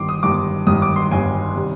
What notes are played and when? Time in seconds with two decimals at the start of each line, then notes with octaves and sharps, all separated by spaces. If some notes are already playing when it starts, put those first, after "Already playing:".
Already playing: G1 G2 D#3 C6 D6
0.09 D#6
0.23 G1 G2 D#3 D6
0.66 G1 G2 D#3 D#6
0.82 D6
0.96 C6
1.11 G1 G2 D#3 G#5
1.56 C3 D#3 G3